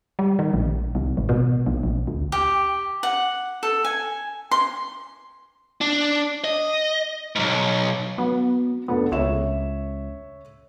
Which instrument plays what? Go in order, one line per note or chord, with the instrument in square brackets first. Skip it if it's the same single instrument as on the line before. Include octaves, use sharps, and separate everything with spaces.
[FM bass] G3
D#3
A#1
C2
G#1
B2
B1
A#1
D2
[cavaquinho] G4
F#5
A4
G#5
C6
[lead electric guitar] D4
D#5
B1 G#2
[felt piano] F#3 [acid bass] B3
[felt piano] F1 D4 A4 [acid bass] B3
[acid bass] C#2 [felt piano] C#5 E5 E7